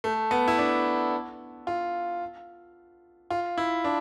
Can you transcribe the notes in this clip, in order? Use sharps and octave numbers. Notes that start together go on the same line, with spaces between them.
A3
B3
E4
D4
F4
F4
E4
D4